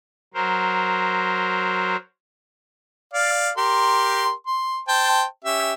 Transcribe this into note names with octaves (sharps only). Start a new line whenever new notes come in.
F#3 A#4 C5
D5 F5
G4 A#4 C6
C6
C5 G5 A5
C#4 G4 E5